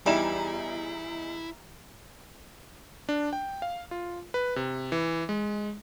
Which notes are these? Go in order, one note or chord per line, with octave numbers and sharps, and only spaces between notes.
E2 E3 G3 D#4 E4 E5 A#5 E7
D4
G5
F5
F4
B4
C3
E3
G#3